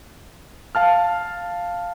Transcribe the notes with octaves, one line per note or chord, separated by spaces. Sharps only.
F5 A5 F6